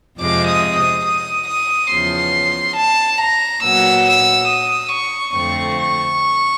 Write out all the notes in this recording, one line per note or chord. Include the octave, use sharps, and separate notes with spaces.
F2 C3 F3 G#3 D6
D#6
D#6
D#6
D#6
E2 C#3 F3 C6
A5
A#5
A#2 F#3 B3 E6
E6
D#6
C#6
F2 D3 F3 A3 C4 C#6
C#6